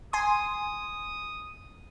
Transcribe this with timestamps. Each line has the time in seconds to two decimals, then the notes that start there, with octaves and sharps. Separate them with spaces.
0.13 G#5 C6 D#6